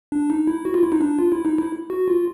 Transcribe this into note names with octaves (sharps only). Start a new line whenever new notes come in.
D4
D#4
E4
F#4
F4
E4
D#4
D4
F4
E4
D#4
E4
F#4
F4